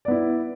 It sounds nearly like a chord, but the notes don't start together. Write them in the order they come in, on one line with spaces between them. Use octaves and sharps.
D5 B3 E4